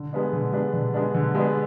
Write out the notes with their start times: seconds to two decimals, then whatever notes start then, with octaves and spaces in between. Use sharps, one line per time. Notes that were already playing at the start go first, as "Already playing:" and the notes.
Already playing: D3
0.13 G#3 B3 D4
0.33 D3
0.53 G#3 B3 D4
0.73 D3
0.94 G#3 B3 D4
1.14 D3
1.35 G#3 B3 D4